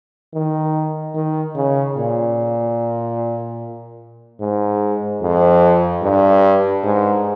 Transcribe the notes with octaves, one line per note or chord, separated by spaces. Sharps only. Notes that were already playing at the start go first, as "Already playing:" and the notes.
D#3
D#3
C#3
A#2
G#2
F2
G2
G#2